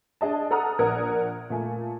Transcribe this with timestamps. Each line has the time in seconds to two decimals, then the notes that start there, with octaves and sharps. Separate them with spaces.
0.21 D4 G#4 D#5 A5
0.51 A4 F#5 A#5 D#6 F6
0.79 A#1 A#4 D5 F#5 D#6 G#6
1.50 A#2 A3 G#5